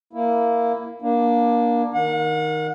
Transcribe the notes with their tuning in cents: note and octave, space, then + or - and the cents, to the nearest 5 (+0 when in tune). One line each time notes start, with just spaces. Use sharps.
A#3 +0 E4 +0
A#3 +20 D4 +0
D#3 +0 F#5 -40